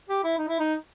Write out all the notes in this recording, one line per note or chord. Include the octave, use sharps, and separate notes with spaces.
G4
E4
D#4
E4
D#4